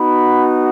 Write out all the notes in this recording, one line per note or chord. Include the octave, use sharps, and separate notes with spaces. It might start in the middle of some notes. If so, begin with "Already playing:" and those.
Already playing: B3 D#4 F#4 B5